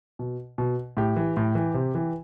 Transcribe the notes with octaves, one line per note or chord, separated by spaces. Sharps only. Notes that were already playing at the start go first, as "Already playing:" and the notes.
B2
B2
A2 G4
E3
A2
E3
C3
E3